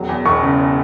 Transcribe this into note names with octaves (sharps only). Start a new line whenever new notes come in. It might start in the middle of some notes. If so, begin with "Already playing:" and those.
Already playing: E1 F#3
E2
E1 C#6
C#3